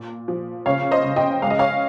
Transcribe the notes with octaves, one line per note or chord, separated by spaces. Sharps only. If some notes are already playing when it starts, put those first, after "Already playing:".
Already playing: A#2
F3
C#3 C#5 F5
C5 D#5
C#3
D#5 G5
G#3 F5
D#5
C#5 F5